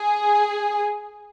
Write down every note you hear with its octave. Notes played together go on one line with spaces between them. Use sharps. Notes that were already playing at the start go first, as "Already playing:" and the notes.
Already playing: G#4